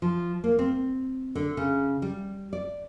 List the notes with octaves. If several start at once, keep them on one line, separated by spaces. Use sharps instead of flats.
F3
A#3
C4
D3
C#3
G3
D5